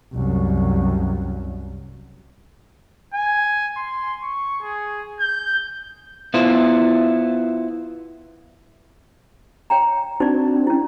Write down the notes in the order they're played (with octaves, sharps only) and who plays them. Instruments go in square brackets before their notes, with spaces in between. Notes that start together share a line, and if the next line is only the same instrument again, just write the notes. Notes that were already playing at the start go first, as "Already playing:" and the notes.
[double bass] C2 F#2
[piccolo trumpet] G#5
C6
C#6
G#4
G6
[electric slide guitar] B3 E4 F4 C5
[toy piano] C#5 G5 A#5
[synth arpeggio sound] C4 D4 F#4 [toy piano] D#4 D5
[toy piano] C#4 E4